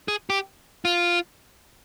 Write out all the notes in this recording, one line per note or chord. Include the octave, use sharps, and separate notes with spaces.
G#4
G4
F4